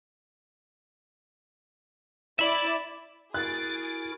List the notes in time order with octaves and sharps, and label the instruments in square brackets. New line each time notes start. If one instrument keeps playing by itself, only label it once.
[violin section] E4 D5 [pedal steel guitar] E5 B5
[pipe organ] E4 F#4 A#4 [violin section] G#4 A6 D7 [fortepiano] F#6